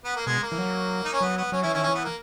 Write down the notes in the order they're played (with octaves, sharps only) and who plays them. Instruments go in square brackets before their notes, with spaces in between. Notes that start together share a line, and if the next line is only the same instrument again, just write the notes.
[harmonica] B3
A#3
[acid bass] B2 [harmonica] G#3
[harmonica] A#3
[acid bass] E3
F#3
[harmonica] D#4
C#4
[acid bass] F#3 [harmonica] B3
[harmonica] B3
[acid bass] F#3 [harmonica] C#4
[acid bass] E3 [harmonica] C#4 E4
[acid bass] D#3 [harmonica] C#4 E4
[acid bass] E3 [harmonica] C#4
[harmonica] B3
A#3